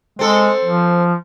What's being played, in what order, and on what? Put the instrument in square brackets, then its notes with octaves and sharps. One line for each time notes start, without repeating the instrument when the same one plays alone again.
[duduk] G#3 [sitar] C4 A4
[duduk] F3